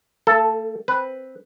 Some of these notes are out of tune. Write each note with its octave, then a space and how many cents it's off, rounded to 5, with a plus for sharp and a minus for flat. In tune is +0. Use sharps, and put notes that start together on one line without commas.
A3 +45 A4 +0
C4 +0 B4 +0